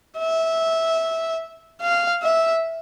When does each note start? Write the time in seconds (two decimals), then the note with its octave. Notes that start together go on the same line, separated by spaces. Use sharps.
0.18 E5
1.81 F5
2.23 E5